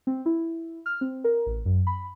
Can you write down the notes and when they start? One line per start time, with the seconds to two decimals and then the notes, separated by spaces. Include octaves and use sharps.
0.07 C4
0.26 E4
0.86 F6
1.01 C4
1.24 A#4
1.46 A1
1.66 F#2
1.87 B5